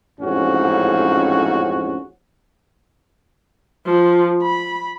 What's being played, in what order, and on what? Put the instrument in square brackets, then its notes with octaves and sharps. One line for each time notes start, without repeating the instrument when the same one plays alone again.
[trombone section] A1 F2 G#2 C#4 F#4
[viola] F3
B5